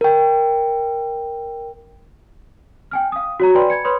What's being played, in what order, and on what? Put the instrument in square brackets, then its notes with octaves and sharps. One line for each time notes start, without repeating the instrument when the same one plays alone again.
[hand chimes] A#4 G5
[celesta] G5 G#5 F6
F5 D#6
F#4 C#5 A#5
B4 D5 G5 G#5 B5 C6
B5 G#6 C#7
B4 C#5 B5 C6 D#6